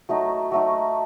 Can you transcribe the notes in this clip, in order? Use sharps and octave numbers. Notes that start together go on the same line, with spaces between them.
F#3 A3 D#4
F#3 A3 D#4